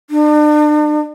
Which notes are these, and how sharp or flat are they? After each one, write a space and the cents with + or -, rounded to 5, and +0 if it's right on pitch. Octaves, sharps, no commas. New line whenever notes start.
D4 +40